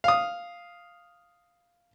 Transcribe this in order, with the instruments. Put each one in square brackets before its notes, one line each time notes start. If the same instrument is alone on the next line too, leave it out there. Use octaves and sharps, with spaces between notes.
[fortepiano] F5 D#6